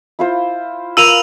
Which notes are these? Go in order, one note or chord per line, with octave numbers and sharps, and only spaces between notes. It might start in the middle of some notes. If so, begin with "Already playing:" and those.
E4 F4 C5
F4 A#4 B4 E6 D#7 F7